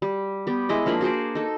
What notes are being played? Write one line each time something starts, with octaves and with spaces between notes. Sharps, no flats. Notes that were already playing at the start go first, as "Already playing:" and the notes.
G3
B3 G4
G#3 E4 D#5
F3 A#3 D4 B5
F#4 G#4 C5 D5
D#4 A4